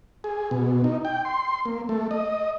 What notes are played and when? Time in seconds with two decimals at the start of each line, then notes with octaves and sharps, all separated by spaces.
0.24 G#4
0.51 B2
0.84 D#4
1.05 G5
1.25 C6
1.65 A#3
1.89 A3
2.11 D#5